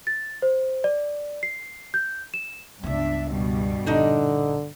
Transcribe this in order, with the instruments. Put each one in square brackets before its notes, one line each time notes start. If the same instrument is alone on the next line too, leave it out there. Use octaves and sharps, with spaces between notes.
[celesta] A6
C5
D5
C7
G6
E7
[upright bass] C#2 B3 [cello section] G2 D4 E5
[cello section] G2 B2 G3
[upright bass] A#1 [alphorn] D3 [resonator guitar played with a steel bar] D4 D#4 D#5